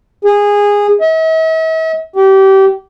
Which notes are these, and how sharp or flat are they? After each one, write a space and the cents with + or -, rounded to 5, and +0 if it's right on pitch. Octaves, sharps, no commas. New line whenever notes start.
G#4 -15
E5 -45
G4 -25